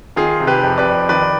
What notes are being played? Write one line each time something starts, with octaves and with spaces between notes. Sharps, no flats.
D#3 F4 G#4
C3
G4 B4
F2
B4 D5
F2
D#3 B4 D5